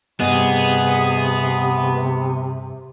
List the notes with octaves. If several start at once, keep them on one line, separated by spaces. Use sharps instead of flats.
G2 C3 B3 G#4 D#5